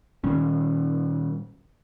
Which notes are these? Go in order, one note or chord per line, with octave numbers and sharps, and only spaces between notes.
A#2 D#3 G3 C#4